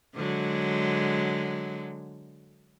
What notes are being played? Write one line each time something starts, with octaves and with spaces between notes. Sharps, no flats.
D3 F#3 G#3